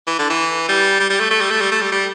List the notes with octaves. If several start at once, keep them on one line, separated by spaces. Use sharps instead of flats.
E3
D3
E3
G3
G3
G3
A3
A3
G3
A3
G3
A3
G3
G3